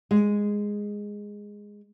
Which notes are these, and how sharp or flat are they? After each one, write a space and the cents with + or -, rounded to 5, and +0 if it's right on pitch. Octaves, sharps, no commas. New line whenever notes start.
G#3 -10